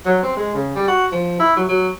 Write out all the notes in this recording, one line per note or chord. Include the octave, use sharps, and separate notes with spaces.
F#3
C4
G#3
C#3
G3
F#4
F3
E4
F#3
F#3